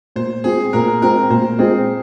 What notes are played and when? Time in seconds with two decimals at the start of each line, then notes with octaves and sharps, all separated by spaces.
0.16 A#2 C5
0.44 G#3 C4 F4 G#4
0.73 A#2 A#4
1.02 G#3 C4 F4 A#4
1.30 A#2 C5
1.59 G#3 C4 F4 G#4